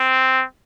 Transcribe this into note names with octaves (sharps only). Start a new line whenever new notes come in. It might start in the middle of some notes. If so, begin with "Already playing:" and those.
Already playing: C4